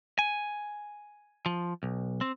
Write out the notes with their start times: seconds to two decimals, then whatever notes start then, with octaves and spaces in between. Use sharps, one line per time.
0.19 G#5
1.46 F3
1.83 B1
2.21 C4